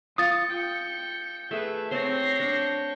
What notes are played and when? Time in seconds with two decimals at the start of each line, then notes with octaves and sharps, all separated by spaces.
0.18 F4 D#6 A6 C#7
0.49 G5
1.51 A3 G#4 B4 E5
1.91 C4 C5 C#5 G5 A#6 C7
2.40 D4